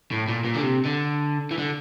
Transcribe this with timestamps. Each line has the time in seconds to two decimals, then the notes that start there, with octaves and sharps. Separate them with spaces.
0.11 A2
0.28 A#2
0.44 A#2
0.55 D3
0.61 C3
0.85 D3
1.51 E3
1.59 D3